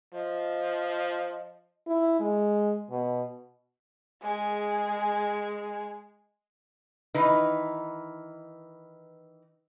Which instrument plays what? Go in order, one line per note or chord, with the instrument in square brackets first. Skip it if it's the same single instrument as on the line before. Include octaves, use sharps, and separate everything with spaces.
[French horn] F3 [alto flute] D#5
[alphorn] E4
G#3
B2
[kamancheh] G#3 G#4
[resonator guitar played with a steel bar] D#3 E3 D#4 B4